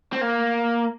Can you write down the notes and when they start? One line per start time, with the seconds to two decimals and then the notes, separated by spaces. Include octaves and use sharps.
0.13 C4
0.21 A#3